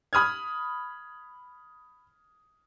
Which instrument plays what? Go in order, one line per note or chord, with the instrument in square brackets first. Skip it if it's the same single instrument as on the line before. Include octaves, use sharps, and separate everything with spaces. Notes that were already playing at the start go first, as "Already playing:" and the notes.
[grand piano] B5 D#6 F6 G#6